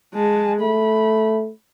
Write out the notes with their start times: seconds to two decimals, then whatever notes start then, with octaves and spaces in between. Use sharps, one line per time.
0.14 G#3 A5
0.60 A3 B5